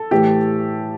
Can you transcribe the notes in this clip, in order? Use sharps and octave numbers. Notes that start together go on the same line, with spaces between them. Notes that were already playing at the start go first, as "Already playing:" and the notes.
Already playing: A4
A2 E3 A3 G4